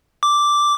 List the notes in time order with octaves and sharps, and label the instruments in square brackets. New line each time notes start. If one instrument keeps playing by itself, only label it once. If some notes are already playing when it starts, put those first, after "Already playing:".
[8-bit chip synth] D6